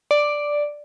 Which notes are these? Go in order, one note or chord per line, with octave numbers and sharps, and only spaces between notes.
D5